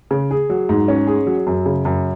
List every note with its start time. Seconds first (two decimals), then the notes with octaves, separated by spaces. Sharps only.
0.11 C#3
0.31 G#4
0.50 F#3
0.69 G#2
0.88 C#4
1.07 G#4
1.27 F#3
1.47 F#2
1.66 C#3
1.85 F#2